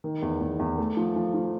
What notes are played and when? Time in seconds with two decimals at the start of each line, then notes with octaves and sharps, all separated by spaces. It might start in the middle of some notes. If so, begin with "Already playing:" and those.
0.04 D#3
0.22 E2
0.41 E2
0.59 E2
0.78 A3
0.97 F3
1.16 F3
1.34 F3